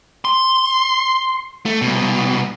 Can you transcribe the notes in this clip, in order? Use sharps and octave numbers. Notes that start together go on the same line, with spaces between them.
C6
A3
C2 B2